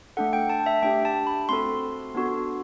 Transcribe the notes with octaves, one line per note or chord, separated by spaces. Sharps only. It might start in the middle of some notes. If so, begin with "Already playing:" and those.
A3 D4 A4 F#5
G5
A5
E5
A3 D4 G4 G5
A5
B5
A3 C4 F#4 A4 C6
B3 D4 F#4 A4